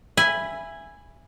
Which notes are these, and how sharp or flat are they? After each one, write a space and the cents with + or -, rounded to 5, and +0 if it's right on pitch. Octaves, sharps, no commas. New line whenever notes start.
E5 +20 G#5 -10 B5 +0